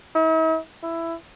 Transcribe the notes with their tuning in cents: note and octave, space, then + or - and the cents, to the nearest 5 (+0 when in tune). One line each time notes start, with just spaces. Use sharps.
E4 -45
E4 +10